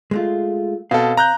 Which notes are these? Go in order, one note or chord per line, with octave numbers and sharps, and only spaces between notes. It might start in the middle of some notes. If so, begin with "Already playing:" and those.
G#3 A3 F4
B2 C4 A4 F5
A#5 F#6 G6